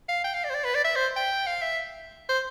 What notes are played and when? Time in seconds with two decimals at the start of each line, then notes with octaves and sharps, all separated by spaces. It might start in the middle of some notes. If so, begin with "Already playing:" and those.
0.08 F5
0.24 G5
0.34 F5
0.44 D5
0.50 C5
0.55 D5
0.64 B4
0.75 D5
0.84 E5
0.96 C5
1.16 G5
1.47 F5
1.62 E5
2.29 C5